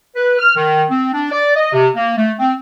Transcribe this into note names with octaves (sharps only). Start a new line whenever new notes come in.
B4
F6
D#3
C4
D4
D5
D#5
C3
A#3
A3
C4